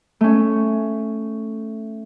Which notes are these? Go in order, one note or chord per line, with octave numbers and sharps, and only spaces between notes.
A3 C#4